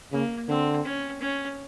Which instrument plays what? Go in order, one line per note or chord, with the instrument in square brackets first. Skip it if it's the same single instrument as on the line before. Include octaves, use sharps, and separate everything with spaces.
[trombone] C#3 [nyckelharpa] A#3
[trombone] D3 [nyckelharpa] C4
[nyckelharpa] C#4
C#4